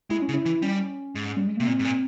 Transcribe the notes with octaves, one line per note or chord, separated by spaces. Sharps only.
G#3 E4
C#4
C#3
E4
E3
G3 C#4
G#2
G3
G#3
C3 A#3
A#2 C4
G#2
A#2